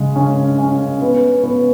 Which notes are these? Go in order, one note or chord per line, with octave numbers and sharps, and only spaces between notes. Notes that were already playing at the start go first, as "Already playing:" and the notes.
Already playing: C#3 G#3
C#4
C#4
B3
B3